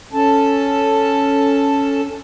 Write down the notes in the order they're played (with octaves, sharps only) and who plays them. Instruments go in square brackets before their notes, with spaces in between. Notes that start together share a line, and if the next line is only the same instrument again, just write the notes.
[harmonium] C#4 A4 A5